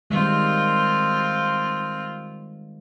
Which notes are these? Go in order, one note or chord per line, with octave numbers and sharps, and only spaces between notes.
D#3 G3 G#3 C4 F4